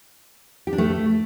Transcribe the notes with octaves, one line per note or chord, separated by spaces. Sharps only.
G4
D4
A3